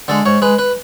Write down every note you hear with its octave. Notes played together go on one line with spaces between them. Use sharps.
D3 G#3 A4
G#2 C#5
G#3 B4
B4